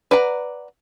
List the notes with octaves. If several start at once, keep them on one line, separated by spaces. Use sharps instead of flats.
B4 D5 F#5 A#5